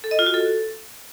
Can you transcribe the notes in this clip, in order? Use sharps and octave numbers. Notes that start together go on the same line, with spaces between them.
A4
D#5
F4
F#4
A4